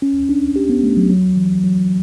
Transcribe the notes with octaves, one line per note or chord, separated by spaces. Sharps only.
C#4
D4
G4
B3
A3
F#3
F#3
E3
F#3